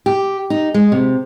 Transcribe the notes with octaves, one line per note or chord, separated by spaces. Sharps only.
G4
D#4
G#3
C3